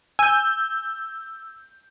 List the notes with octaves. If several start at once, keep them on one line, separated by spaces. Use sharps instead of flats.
G#5 E6 G6